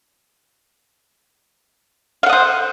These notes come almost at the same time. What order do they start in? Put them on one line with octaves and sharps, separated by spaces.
F5 F#5 D#5 C5